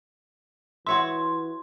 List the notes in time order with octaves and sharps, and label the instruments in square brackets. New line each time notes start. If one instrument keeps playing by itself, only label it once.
[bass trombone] E3 [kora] F#4 C#5 E5 [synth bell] C6